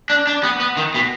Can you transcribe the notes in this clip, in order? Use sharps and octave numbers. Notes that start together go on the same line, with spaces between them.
D4
D4
B3
B3
D#3
B2